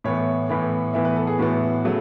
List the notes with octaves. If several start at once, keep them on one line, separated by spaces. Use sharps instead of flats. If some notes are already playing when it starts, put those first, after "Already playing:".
A2 E3 B3 C#5
A2 E3 B3
A2 E3 B3 E5
B4
A4
G#4
A2 E3 B3 F#4
C#3 F#3 A3